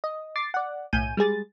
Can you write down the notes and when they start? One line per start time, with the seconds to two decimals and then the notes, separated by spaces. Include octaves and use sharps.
0.04 D#5
0.36 D6 A6 C7
0.54 D5 F#5
0.93 B1 A2 G#5 G6 D#7
1.17 G3 G#3 G#4 A6